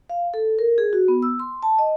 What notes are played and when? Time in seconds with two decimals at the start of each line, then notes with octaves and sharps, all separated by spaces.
0.10 F5
0.34 A4
0.59 A#4
0.78 G#4
0.93 F#4
1.08 B3
1.22 E6
1.40 C6
1.63 A5
1.79 D#5